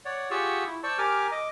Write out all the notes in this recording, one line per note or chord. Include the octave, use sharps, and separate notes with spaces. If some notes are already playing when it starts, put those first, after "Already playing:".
C#5 D5 F#5
F4 G4 G#4 F#5 C#6 E6
E4
C5 D5 A5 C#6 E6
G4 A#4 G#5 D6 F6
D#5 D6